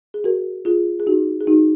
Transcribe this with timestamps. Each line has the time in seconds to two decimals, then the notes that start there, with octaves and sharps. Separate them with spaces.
0.14 G#4
0.24 F#4 A#4
0.65 F4 G#4
1.00 G#4
1.07 D#4 F#4
1.41 G#4
1.47 D#4 F#4